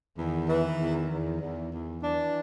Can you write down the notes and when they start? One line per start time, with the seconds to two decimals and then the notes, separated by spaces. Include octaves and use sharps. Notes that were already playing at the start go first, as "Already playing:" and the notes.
0.17 E2 D#3
0.48 E3
0.79 E2
1.10 E2
1.41 E2
1.72 E2
2.03 E3 D4